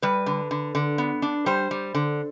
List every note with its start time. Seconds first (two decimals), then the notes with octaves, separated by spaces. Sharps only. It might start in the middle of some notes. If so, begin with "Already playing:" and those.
0.02 G3 B4
0.26 D3
0.51 D3
0.75 D3
0.98 B3
1.22 D4
1.46 G3 C5
1.71 G3
1.95 D3